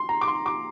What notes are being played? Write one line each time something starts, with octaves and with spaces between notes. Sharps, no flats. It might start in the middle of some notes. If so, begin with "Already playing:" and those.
Already playing: C6
A#5
D6
C6
D6